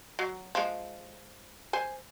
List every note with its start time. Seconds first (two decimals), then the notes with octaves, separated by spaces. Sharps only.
0.19 F#3
0.55 F3 G#3
1.73 C5 G#5